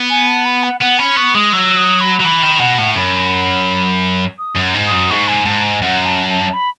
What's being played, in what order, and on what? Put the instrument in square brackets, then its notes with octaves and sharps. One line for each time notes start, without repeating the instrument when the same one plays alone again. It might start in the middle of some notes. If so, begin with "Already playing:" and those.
Already playing: [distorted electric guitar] B3
[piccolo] G#5
A5
B5
F#5
[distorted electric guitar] B3 [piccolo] F#5
[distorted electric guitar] C#4 [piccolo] B5
[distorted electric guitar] B3 [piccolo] C#6
[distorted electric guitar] G#3 [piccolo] D#6
[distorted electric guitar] F#3 [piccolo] E6
[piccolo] D#6
B5
[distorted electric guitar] F#3
[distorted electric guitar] E3 [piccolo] B5
[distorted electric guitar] D#3
[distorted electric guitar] B2 [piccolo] F#5
[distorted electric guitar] A2
[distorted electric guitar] F#2 [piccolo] B5
[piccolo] D#6
[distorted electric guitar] F#2
G#2
[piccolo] D#6
[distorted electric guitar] F#2
[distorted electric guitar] G#2 [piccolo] C#6
[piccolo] G#5
[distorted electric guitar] G#2 [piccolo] A5
[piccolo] G#5
[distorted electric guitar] F#2 [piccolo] F#5
[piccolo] A5
A5
B5